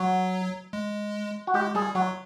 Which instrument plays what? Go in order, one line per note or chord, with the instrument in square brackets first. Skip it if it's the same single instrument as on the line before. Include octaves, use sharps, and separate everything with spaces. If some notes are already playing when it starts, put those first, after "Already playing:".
Already playing: [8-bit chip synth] F#3 [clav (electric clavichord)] F#4
[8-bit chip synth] G#3
[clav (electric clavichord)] F#4
[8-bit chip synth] G#3 [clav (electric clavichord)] G4
[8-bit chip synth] G3 [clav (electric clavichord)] G#4
[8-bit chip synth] F#3 [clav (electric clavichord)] F#4